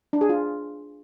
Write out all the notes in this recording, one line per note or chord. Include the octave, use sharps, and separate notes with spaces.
D4
G#4
F4